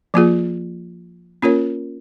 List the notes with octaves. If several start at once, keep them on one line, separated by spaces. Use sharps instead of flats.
F3 A#3 F4 G#4
A#3 C#4 F4 A#4 C#5